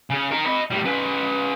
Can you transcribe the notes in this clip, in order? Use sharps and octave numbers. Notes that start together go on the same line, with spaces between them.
C#3 C#4
D#4 A#4
D#5 B5
A2 G3
C#4 B4